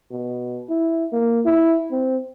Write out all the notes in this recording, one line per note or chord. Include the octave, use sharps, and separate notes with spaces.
B2
E4
A#3
E4
C4